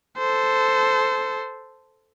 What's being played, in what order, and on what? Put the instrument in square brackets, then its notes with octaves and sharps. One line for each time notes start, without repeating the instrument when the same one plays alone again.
[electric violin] A4 C5